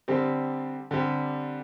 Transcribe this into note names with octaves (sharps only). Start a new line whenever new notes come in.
D3 G3 C4 G4
D3 G3 C4 G4